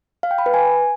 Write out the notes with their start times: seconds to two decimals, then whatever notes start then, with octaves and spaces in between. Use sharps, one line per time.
0.23 F5
0.31 G5
0.38 B5
0.46 B4
0.54 G#5